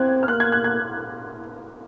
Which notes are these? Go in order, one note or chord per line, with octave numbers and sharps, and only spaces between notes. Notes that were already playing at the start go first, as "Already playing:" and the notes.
Already playing: C4 F#6 G#6
F6
A#3 F#6
G#6
F#6
G#6